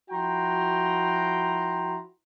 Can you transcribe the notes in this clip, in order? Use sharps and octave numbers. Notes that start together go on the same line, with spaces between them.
F3 E4 F#4 G5 A#5 C6